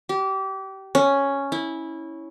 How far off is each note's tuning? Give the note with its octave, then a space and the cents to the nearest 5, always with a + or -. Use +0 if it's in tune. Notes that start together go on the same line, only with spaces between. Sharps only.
G4 -25
C#4 +0
E4 -15